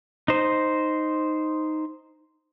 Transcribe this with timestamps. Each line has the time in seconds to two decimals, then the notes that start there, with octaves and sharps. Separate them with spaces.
0.28 D#4 C5